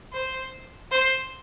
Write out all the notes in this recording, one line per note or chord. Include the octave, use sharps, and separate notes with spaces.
C5
C5